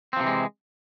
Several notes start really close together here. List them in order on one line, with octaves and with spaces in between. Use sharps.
C4 F3 C3 E3 G#3